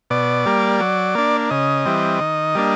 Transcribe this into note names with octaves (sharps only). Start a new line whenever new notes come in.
B2 D5
G3 A#3
F#3
A#3 D4
C#3 D#5
E3 G3 C4
D#3
G3 A#3 D4